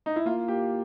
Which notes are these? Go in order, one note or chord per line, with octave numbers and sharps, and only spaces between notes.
D#4
E4
A#3 F4
A#3 G4